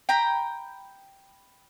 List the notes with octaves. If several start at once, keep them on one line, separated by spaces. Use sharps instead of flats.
G5 A#5 B5